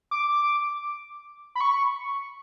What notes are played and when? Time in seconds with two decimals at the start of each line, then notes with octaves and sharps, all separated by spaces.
0.11 D6
1.55 B5
1.61 C#6